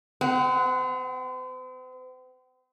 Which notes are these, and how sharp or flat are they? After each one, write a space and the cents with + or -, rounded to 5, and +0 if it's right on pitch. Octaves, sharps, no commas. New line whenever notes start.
C4 -45 F#5 +0